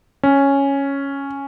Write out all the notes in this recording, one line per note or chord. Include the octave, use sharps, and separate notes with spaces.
C#4